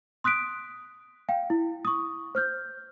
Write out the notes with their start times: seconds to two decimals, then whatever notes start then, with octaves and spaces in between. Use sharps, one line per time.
0.24 C6 D#6 F#6 B6 D7
1.29 F5 G5
1.50 E4
1.85 C#6 D#6
2.35 C5 F6 G6